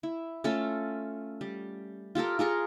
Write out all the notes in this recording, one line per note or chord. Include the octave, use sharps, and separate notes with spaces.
E4
A3 C#4 F4 A4
G3
F4 G4 A4 A#4
F4 G#4 A#4 C#6